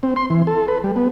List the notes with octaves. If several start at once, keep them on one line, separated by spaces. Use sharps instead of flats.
C4
C6
E3
A4
B4
G3
B3